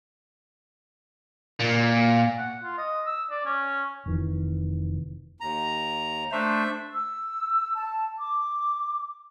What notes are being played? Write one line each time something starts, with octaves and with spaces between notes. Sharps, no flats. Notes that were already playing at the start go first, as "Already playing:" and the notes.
A#2
F#5
F4
D#5
E6
D5
C#4
F1 C3 D#3 E3
D#2 A#5
A3 D4 C5 E5
E6
A5
D6